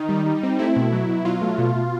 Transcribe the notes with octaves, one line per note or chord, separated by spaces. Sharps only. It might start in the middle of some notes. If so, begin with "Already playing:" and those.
Already playing: D#3 D#4
G3
G3
C4
A3 E4
B2
F#3
B2
F#3 F4
A3
B2
B2